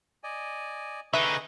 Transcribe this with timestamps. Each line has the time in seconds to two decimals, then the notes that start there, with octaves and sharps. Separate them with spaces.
0.24 D5 D#5 G#5
1.14 D3 D#4 G#4 B4 D#5 E5 C#6 D#6